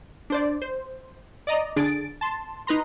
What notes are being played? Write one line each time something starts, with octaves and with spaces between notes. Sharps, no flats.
D4 C5 D5
C5
D5 D#5 A#5
D3 D4 G#4 A6 D7
A5 C6
D#4 B4 A#5 C6